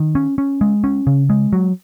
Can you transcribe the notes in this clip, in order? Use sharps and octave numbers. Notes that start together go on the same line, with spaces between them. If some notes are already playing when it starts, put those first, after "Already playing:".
Already playing: D#3
C#4
C#4
G#3
C#4
C#3
G#3
F#3